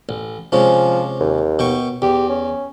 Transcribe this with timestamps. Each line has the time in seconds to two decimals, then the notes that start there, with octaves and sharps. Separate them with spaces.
0.09 A1
0.52 C3 F3 G#3 C#4
1.20 D#2
1.59 B2 G5 C#6
2.02 E2 G4
2.29 C#4